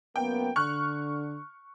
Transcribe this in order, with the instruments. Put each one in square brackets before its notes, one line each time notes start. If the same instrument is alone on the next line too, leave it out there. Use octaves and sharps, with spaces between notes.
[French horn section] F#2 A#3 B3 [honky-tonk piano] G5
[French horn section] D3 [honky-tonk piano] C#6 F6 F#6